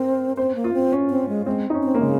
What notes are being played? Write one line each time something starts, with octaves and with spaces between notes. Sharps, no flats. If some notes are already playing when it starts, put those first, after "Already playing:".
Already playing: C4 A#4 C5
C4 C5
A#3
F4
C4
C#4
C4
G#3
G#3 C4
D#4
C#4
C4
A#3
C#3 G#3